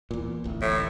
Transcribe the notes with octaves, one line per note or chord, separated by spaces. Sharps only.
E2 A#2
D1 A1
A2